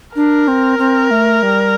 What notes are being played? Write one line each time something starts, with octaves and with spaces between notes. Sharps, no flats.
D4 A#4
C4
C4
A3
G3